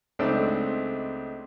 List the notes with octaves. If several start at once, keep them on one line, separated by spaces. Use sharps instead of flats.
C#2 A3 C4 D4 D#4 E6